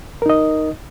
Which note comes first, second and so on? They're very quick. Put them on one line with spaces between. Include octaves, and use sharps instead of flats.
A#4 D#4 D#5